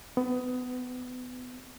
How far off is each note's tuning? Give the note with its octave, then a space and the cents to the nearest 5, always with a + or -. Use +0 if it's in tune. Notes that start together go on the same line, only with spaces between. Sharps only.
B3 +25